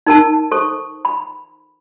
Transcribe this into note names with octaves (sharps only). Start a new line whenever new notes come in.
D#4 A#4 A5
A4 C5 C#6
B5